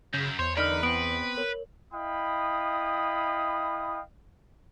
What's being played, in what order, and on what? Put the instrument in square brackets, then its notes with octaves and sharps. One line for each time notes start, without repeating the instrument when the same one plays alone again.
[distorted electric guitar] F#2 [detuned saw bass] C#3 [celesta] G6
[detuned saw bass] E2 [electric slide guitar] C5 [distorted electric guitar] C#5
[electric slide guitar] D3 D#4 A#4 [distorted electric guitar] B4 [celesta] D5 F6
[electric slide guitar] B3 C4 [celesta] D7 F#7
[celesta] A#4 C#5
[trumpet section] E4 D#5 F5 G5 B5 D#6